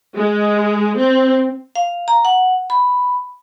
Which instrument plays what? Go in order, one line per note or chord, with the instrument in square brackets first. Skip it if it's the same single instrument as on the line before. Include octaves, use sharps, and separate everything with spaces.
[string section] G#3
C4
[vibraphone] F5
A#5
F#5
B5